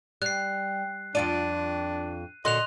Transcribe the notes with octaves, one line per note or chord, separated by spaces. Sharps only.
G3 F#6 C7
F2 D4 F4 D5 D#7
A#2 D3 F#4 D#5 C6 F#6 F7